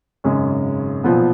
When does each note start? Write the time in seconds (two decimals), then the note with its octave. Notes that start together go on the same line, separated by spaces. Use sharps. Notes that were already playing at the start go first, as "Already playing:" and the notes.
0.24 G#1 F#2 C#3 G#3 C#4
1.04 B1 A#2 F3 B3